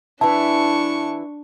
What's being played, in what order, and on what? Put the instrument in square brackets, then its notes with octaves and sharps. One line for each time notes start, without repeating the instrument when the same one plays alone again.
[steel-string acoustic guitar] E3 E4 [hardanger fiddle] D4 C#6 [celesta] A5